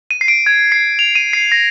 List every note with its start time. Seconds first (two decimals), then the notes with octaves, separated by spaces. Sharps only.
0.11 D#7
0.21 C7
0.28 D7
0.46 G#6
0.72 C7
0.99 F7
1.15 D#7
1.33 C7
1.52 A#6